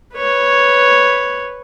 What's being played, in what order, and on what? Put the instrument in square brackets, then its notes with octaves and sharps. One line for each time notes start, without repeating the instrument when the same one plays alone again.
[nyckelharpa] B4 C#5